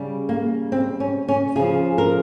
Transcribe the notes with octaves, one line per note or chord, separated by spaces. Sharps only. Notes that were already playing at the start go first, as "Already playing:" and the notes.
Already playing: C#3 G3
A#3
C4
C#4
C#4
C#3 F3 G#4
A#4